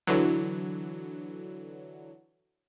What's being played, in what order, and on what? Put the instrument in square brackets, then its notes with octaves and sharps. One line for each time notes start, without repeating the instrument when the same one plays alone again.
[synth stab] D3 E3 F#3